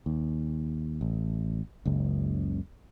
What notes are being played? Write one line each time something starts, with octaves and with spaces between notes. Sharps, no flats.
D#2
A1
F#1 C#2